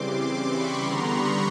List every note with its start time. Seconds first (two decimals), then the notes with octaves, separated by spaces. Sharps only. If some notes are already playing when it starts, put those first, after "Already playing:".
Already playing: C#3 E3 G3 C4 C6 D6
0.21 C6 D6
0.50 B5 C#6
0.78 D3 G3 B3 A#5 C6
1.07 B5 C#6